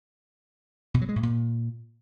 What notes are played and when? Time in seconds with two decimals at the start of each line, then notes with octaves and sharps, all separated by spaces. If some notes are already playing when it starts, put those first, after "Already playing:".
0.94 B2
1.01 F#3
1.09 G#3
1.16 A2
1.23 A#2